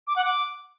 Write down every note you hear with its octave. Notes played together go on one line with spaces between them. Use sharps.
D6
F#5
D6